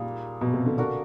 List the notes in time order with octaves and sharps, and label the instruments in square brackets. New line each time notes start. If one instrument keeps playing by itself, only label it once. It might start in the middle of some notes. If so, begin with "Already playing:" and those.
Already playing: [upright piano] A#2 [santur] G3 A#3 D#4 G#4
[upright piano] B2
C3
D3
[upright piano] D3 [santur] D4 F#4 A#4